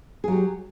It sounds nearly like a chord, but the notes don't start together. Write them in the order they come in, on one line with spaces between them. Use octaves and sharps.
G#4 F#3 G4